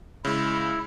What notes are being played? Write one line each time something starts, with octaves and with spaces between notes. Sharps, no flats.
C#3 G#3 E4